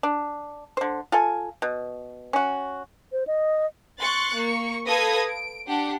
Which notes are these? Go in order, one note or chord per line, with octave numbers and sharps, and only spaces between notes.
D4
D3 C5
F4 A4 G#5
B2
C#4 F#4
C5
D#5
C6 C#6 F#6 A6
A#3 C#6
A4 B4 F5 D#6 G#6 A#6
D7
D4 G4 F#5